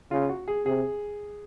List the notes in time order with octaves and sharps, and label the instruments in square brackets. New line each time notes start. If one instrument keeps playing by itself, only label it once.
[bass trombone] C#3 [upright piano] F4
[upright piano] F#4
G#4
[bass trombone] C3 [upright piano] G#4